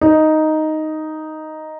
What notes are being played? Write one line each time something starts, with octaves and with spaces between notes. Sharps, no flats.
D#4